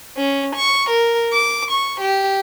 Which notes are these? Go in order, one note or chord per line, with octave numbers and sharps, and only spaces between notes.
C#4
C#6
A#4
D6
C#6
G4